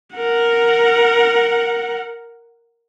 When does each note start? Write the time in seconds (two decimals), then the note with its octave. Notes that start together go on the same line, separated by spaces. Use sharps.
0.16 A#4 F#5